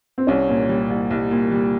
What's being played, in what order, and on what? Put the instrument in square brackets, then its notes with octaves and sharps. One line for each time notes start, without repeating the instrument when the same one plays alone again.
[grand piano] C4
[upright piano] C2 [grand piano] C#4
[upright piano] A#2
G3
C2
C2
A#2
G3